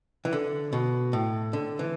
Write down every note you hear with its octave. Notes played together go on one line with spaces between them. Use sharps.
E3
D3
B2
A2
D3
E3